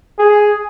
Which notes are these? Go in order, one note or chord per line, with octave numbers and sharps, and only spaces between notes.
G#4